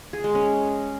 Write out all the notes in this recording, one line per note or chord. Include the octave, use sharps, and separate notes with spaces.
G#4
G#3
C#4